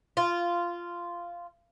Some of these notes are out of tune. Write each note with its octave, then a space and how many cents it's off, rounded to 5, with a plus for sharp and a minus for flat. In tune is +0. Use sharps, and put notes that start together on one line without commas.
F4 -10